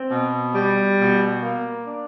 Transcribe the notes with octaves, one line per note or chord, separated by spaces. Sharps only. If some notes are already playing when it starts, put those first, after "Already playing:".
Already playing: C4
B2
G3
B2
A#3
D4